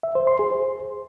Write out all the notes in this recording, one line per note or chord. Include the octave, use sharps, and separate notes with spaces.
E5
C5
C6
G#4
C5